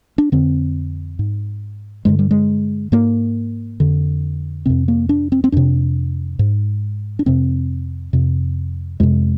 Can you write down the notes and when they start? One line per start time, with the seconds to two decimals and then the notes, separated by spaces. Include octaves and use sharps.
0.18 D4
0.32 F2 D3 C4
1.19 G#2
2.05 G2 D3 G#3
2.19 G3
2.31 G#3
2.92 G#2 A#3
3.80 F2 D3
4.66 F2 C3 C4
4.88 A#3
5.09 D4
5.32 C4
5.44 C4
5.52 F2 C3 D4
6.39 G#2
7.19 D4
7.26 F2 C3 C4
8.13 F2 C3
9.00 F2 C3 G#3